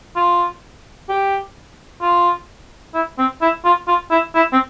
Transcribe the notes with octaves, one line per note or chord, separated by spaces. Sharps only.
F4
G4
F4
E4
C4
E4
F4
F4
E4
E4
C4